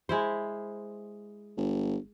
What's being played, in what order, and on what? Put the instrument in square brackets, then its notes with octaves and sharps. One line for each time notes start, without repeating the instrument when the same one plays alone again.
[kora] G#3 E4 C5
[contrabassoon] G1